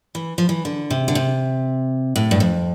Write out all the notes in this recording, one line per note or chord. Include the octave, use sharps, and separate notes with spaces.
E3
F3
E3
D3
C3
D3
C3
A2
G2
F2